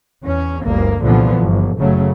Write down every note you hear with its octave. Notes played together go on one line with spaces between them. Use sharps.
E2 C#4
G1 D2 G2 A#3
C2 A#2 D3 E3 F3 B3
G1
F#1 C#3 F#3 A3